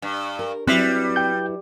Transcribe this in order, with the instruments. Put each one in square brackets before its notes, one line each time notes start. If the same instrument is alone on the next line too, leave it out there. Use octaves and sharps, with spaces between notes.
[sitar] G2
[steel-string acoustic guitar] A#4
[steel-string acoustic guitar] F#3 E4 B4 [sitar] G3 [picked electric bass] C4 [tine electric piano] F#6 B6 C7
[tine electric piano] G5 G6